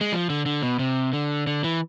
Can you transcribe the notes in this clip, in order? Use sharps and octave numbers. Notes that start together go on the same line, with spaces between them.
G#3
F3
D3
D3
B2
C3
D3
D3
E3